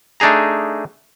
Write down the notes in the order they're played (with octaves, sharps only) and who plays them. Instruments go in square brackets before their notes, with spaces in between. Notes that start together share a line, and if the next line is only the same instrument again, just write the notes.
[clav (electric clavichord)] A3 D4 D#4 G#4 A#5